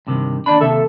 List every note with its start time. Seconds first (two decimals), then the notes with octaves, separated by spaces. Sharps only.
0.07 G2 C3 D#3
0.46 D#2 D4 D5 B5
0.60 D#2 C3 A4 E5